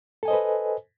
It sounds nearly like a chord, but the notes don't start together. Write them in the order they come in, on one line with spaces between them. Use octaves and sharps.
A4 G#5 D#5 C5 B4